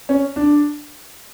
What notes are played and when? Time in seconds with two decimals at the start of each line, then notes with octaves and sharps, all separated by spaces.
0.09 C#4
0.36 D4